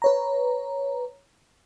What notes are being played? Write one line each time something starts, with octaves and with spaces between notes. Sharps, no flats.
B4 C#5 A#5